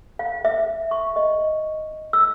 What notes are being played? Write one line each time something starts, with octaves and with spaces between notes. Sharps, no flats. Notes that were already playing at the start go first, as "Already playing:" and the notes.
F5
E5
C#6
D#5
E6